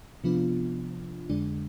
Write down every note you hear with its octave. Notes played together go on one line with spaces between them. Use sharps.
C3 F3 B3 D4 F4
F2 D3 G#3 D4